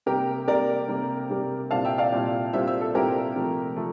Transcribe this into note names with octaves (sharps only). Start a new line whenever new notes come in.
C3 G3 A#3 G4 A#4
C3 G3 A#3 A#4 D5
C3 G3 A#3
C3 G3 A#3
A#2 G3 C4 E4 F5 A5
E5 G5
D5 F5
A#2 G3 C4 E4
A#2 G3 C4 E4 C5 E5
C5 E5
A4
A#2 G3 C4 E4 G4 A#4
C3 F3 A3
F3 A3